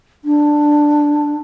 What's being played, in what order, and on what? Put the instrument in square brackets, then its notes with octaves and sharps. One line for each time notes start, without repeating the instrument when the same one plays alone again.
[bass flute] D4